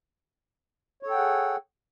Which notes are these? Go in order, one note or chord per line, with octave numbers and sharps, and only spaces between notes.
G#4 A4 C#5 F#5 G5